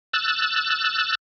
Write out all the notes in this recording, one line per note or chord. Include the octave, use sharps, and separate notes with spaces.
E6 F#6 A6